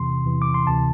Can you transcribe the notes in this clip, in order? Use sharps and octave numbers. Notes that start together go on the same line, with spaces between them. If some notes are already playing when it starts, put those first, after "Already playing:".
Already playing: E2 C3 E3 C6
E2 C3 E3
D6
C6
D2 C3 E3 A5